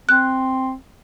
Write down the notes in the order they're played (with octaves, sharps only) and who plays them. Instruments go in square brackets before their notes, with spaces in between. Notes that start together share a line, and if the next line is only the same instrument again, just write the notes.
[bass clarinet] C4 [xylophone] F#6